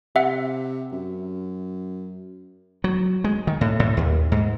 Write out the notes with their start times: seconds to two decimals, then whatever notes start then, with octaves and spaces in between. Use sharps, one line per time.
0.16 C3 E5 F#5
0.92 F#2
2.84 F#3
3.24 G#3
3.47 D#3
3.61 A2
3.80 A2
3.97 D#2
4.32 G#2